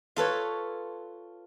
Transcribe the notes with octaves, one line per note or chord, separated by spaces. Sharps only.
F4 A4 B4 C#5